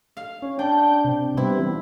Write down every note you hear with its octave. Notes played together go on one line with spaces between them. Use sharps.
F5
C#4
D4 G5
C3
G3 B3 C4 E4
E3